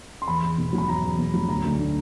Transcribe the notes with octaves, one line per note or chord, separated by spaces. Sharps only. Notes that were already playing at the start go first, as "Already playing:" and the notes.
C6
E2 B5
E2
B2
F#3
B5
E2 A#5
E2
B2
F#3
D2 A#5
D2
D3